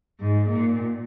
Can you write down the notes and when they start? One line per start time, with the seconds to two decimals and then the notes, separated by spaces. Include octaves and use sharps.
0.20 G#2
0.48 A#2